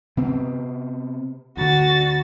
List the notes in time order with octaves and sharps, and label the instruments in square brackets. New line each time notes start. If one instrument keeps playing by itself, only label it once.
[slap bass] C3 B3 C4
[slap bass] D2 D3 [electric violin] F#4 A6